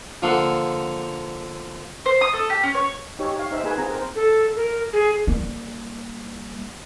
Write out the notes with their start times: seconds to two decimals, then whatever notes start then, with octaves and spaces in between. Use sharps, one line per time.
0.22 D3 F3 A#3 A4 F#5 C6
2.06 C5
2.21 D#6
2.33 A4
2.50 G4
2.63 C#4
2.75 C#5
3.19 D#4 G4 C#5
3.36 C#5 F5
3.51 D#4 C5 E5
3.63 A#3 F4 G#4 B4 G#5
3.78 C4 A#5
3.90 A#4 C5
4.16 A4
4.56 A#4
4.93 G#4
5.27 G3 A#3